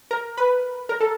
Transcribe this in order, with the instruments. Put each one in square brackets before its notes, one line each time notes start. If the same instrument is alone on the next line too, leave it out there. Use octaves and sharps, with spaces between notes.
[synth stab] A#4
B4
A#4
A4